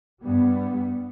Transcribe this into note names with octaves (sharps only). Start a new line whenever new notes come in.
G2 G3 B3